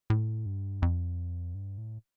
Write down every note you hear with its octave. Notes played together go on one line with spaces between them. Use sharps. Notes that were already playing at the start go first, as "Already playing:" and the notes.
A2
G2
F2
G2
A2